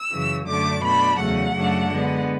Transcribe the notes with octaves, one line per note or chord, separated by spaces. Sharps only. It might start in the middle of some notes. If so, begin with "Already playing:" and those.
Already playing: E6
F#2 C#3 E3
F#2 D3 A3 D4 D6
B2 A3 D4 B5
E2 C#3 F#3 A3 F#5
F#2 C#3 F#3 A3 D4
D3 G#3 B3